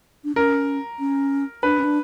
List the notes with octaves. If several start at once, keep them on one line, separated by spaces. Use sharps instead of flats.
D4
C#4 A#4
C#4
D4 B4
C#4
D4